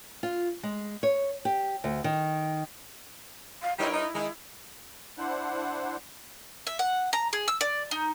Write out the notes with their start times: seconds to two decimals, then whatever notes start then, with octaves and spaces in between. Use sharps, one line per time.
0.23 F4
0.63 G#3
1.03 C#5
1.45 G4
1.84 D2
2.04 D#3
3.61 F5
3.79 G2 G3 D#4 E4 A#4 C#5
3.93 D#4
4.15 D#3 G#3 D#4
5.18 D4 E4 C5 F#5
6.67 E5
6.79 F#5
7.13 A#5
7.33 G#4
7.48 E6
7.61 D5
7.91 D#4